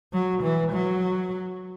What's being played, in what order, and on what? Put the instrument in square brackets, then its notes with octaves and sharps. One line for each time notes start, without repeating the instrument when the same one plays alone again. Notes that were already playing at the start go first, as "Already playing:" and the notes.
[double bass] F#3
E3
F#3